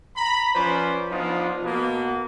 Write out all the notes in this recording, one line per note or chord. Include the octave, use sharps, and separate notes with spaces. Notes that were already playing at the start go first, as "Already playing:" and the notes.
A#5 B5
F3 C#4 B4 C5 D5
F3 B3 D4 D#4 F4
B2 A#3 B3